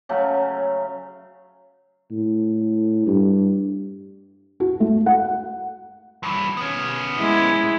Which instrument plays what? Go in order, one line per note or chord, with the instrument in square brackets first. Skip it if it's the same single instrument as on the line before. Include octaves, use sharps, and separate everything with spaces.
[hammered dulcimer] C#3 F#3 A3 C#4
[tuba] A2
G2
[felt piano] F#4
A3
F#5
[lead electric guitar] G2 E3
B3 C#4
[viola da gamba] G#3 E4